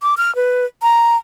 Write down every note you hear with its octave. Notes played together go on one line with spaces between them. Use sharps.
D6
F6
B4
A#5